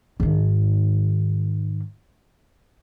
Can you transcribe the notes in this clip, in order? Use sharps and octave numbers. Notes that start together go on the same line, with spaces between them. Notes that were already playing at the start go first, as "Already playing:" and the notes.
G#2 D#3